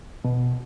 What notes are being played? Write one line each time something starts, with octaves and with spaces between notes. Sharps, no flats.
B2